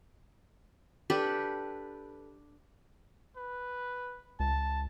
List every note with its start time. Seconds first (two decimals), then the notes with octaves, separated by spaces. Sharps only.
1.10 D4 G4 A4 B4
3.37 B4
4.40 C#2 A5